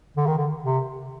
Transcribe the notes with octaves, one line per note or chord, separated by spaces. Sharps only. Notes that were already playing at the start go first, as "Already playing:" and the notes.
D3
D#3
D3
C3